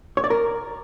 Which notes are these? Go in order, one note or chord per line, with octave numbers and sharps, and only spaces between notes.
C#5
D5
A#4